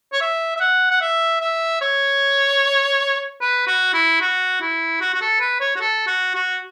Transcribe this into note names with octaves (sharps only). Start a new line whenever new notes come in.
C#5
E5
E5
F#5
F#5
E5
E5
C#5
B4
F#4
E4
F#4
E4
F#4
F#4
A4
B4
C#5
F#4
A4
F#4
F#4